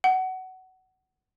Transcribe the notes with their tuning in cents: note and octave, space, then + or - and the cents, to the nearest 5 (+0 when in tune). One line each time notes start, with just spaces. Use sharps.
F#5 +20